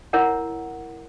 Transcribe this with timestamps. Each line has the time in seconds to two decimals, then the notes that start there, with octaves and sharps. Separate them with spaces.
0.13 E4 A#4 C#5 F#5